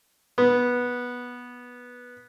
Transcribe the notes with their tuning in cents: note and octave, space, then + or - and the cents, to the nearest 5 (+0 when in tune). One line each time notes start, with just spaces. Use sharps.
B3 -10